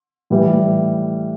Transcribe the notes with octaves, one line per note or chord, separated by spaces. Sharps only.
A2 E3 G3